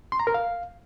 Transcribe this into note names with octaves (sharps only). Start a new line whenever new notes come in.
C6
A#5
A#4
F5